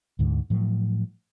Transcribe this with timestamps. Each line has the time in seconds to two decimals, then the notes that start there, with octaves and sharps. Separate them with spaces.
0.19 D2 G#2 D3 G#3
0.50 A2 F3 F#3